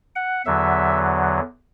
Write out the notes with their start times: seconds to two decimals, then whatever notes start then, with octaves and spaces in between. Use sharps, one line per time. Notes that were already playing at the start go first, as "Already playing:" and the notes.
0.16 F#5
0.46 E2 D3 F#3 E5